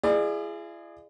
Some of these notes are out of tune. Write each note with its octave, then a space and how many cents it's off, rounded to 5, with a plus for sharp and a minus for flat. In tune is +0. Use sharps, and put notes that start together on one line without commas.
E4 +45 G#4 +0 D5 +40